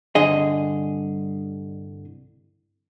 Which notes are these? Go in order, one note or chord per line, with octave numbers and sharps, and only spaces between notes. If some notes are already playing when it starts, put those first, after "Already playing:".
C2 G2 D3 G#4 D#5